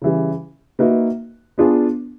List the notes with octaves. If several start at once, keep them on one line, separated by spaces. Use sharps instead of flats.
C#3 E3 G3
A#3 D#4 F#4 B4 E5
B3 D4 F4 G#4